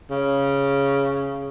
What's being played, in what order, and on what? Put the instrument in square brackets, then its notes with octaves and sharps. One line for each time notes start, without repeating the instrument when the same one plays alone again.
[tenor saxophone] C#3